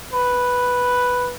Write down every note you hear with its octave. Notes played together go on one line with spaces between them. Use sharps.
B4